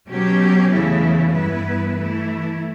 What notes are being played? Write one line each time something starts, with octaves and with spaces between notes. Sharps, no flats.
B2 F#3 C#4 G4
E2 C#3 E3 A3 E4
G2 E3 B3 E4 B4
E3 A3 E4